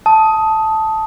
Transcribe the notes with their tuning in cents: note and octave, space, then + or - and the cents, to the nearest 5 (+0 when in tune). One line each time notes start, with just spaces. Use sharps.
A5 -5 D#6 +15